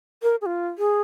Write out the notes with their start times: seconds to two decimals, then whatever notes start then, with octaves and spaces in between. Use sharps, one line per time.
0.23 A#4
0.42 G#4
0.46 F4
0.78 G#4